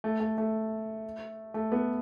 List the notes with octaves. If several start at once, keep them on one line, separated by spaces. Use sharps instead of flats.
A3
A3
A3
A3
B3